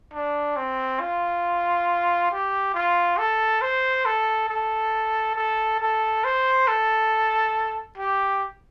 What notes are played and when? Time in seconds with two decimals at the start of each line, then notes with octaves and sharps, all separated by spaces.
0.13 D4
0.56 C4
1.00 F4
2.32 G4
2.74 F4
3.18 A4
3.61 C5
4.06 A4
4.49 A4
5.36 A4
5.80 A4
6.24 C5
6.68 A4
7.98 G4